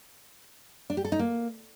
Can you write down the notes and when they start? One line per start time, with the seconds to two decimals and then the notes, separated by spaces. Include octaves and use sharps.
0.90 D4
0.97 G4
1.05 A4
1.12 D#4
1.19 A#3